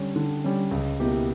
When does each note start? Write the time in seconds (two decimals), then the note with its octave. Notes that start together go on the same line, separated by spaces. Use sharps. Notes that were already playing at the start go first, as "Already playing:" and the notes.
Already playing: D3 G3 C#4
0.16 D3
0.44 G3 C#4
0.71 C#2
1.00 B2 A#3 E4 G4